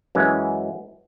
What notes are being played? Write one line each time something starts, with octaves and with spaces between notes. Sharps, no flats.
F#2 E3 G#3 C#4